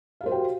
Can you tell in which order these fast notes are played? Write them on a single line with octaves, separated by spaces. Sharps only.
F5 G4 C5 F#4 G5